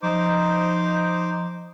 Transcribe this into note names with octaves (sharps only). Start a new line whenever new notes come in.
F3 D#4 C5 D6